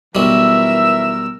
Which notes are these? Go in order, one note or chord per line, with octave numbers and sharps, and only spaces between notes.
B1 E3 G3 E4 A#4 E5 E6